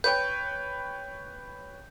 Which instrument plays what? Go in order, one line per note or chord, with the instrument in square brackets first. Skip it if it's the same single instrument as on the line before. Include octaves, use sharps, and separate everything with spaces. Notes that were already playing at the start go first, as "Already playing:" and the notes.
[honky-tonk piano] B4 C#5 G5 [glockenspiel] G6